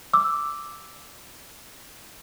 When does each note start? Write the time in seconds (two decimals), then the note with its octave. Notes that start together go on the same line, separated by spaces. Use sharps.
0.13 D6 E6